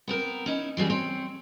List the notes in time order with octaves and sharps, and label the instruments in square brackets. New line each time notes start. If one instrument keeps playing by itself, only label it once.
[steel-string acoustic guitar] B3 C4 A#4
C#4 D#4 E4
E3 F#3 G3 G#4
C4 C#5